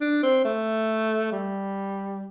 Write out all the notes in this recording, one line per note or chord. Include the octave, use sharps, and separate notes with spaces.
D4
C4
A3
G3